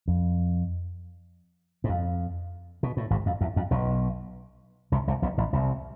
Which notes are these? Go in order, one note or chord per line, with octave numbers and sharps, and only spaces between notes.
F2
G#2
F2
B2
A2
G#1 G#2
F2
E2
F2
B1 B2
C2 C3
C2 C3
B1 B2
A1 A2
C2 C3